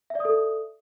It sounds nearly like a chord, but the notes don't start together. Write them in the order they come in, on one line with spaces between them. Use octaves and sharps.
E5 D5 D#6 A4